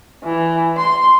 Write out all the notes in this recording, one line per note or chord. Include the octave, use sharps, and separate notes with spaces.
E3
C6